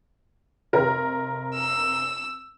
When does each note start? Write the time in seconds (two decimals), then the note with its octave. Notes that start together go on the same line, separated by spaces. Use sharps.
0.73 F1 A#4
1.55 E6